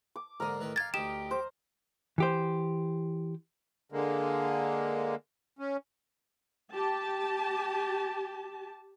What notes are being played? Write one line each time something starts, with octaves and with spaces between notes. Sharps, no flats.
D6
G#2 D3 A#3 A#4 D#5
A2 D#3 B4
F5 G5 G#6 A6
D2 D#4 G4 D#6 E7
C5 D6
E3 G4 C5
D3 G#3 A#3
C#4
G4 A5